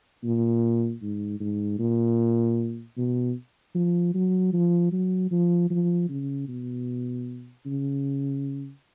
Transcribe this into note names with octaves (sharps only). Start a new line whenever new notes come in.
A#2
G#2
G#2
A#2
B2
F3
F#3
F3
F#3
F3
F3
C#3
B2
C#3